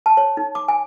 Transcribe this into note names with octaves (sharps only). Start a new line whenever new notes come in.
A5
C#5
D#4
D6
G#5